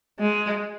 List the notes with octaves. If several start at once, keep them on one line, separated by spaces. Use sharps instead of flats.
G#3